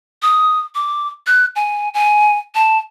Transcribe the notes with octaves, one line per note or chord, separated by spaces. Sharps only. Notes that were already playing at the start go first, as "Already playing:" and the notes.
D#6
D6
F#6
G#5
G#5
A5